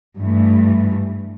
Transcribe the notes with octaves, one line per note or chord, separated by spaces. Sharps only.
G2 E3 A3